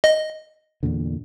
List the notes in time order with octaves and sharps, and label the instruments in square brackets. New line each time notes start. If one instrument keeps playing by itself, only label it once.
[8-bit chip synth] D#5
[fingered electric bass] E2 A#2 D3